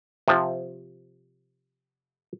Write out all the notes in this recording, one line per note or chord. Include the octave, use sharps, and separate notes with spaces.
C3 F3